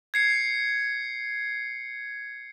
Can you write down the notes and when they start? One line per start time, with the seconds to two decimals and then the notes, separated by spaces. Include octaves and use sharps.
0.14 G#6 C7 C#7